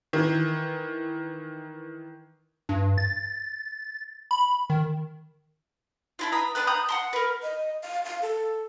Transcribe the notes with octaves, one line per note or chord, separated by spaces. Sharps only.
D#3 E3
G2
A6
B5
D#3
D4 E4 F4
B4 A#5 B5 D#6
B3 D4 B4 F#6
A#5 B5 D#6 G6
F#5 A5 C6
A#4 B4
D#5
F5
F5
A4